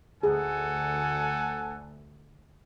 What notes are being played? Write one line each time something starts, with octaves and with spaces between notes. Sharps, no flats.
D2 G#4 A4 F#5 G#5